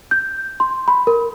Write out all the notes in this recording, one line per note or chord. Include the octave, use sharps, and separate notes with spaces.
G6
C6
B5
A#4